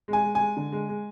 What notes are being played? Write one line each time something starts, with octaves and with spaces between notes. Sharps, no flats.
G#3
G#5
G#3
G#5
G#3
D3
G#3
G#3